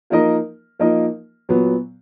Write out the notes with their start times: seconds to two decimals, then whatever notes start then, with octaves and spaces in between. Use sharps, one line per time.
0.10 F3 A#3 D#4 A#4 D#5
0.79 F3 A#3 D#4 A#4 D#5
1.49 A#2 F#3 B3